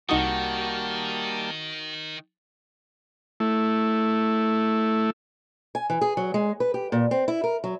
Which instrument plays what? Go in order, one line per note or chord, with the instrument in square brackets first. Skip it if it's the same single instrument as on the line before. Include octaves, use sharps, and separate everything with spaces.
[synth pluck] C2 D#4 D#6 [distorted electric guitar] D#3 [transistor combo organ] G3 A#3 A5 [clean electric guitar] F#4
[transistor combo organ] A3 E4
[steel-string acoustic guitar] G#5
E3
G#4
F#3
G#3
B4
G4
A#2
C4
E4
A#4
F#3